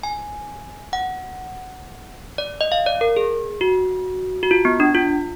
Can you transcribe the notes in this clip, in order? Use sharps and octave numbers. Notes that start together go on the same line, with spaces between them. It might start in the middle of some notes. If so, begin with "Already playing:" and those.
G#5
F#5
D5
D#5
F5
D5
A#4
G#4
F#4
F#4
F4
B3
D4
F4